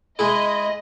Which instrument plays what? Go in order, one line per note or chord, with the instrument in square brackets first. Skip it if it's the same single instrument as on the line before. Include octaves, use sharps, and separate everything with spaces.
[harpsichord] G#3 E4 [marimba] G#4 [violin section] D#5